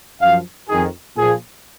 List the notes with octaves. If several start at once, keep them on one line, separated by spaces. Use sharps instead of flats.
F#2 F3 F5
F2 D#3 G#4
A#2 F3 G#4